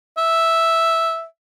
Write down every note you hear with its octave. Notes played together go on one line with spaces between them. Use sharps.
E5